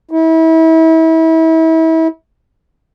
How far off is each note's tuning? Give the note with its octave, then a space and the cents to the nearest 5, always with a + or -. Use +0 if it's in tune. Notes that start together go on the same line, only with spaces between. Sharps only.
E4 -35